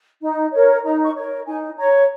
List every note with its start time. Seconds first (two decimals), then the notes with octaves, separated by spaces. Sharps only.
0.21 D#4
0.53 A#4 C#5
0.84 D#4 A#5
1.04 C#6
1.14 A#4 C#5
1.45 D#4 G#5
1.77 C#5 A#5